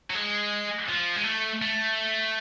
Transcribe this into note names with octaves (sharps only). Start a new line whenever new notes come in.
F#3
G#3
F3
G#3
A3
A3